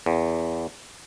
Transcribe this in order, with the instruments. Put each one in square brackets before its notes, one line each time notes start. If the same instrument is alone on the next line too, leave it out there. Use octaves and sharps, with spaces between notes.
[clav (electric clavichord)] E2